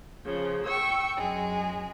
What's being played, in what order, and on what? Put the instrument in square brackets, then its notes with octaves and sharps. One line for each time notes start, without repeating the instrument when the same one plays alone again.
[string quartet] C#3 F3
G5 C#6 E6
F#2 G#3